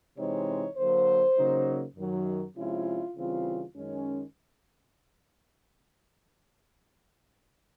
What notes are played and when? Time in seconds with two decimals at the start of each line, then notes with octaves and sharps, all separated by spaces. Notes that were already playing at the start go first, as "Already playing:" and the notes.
0.17 C3 E3 G#3 C4 D#4 C#5
0.77 D3 F#3 A#3 C5
1.36 C#3 F#3 A#3 D#4
1.96 F#2 D#3 F#3
2.56 C3 F3 G#3 C#4 E4 F4
3.16 C#3 E3 G3 C4 F4
3.75 F#2 D#3 G#3 C#4